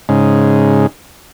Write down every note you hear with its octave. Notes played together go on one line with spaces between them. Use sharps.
G#2 C#3